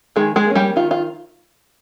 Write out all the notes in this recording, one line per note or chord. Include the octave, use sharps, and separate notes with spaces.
D#3 G#3 G#4
G#3 G#4
A#3 C#4
G3 G4
D#3 F4
F4